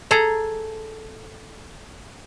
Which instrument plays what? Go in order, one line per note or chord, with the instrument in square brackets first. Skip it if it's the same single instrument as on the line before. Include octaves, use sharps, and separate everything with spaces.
[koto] G#4 A4 A#5